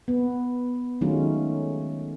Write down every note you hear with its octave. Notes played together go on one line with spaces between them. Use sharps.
B3
D#3 F#3 G#3 A3 C#4 F4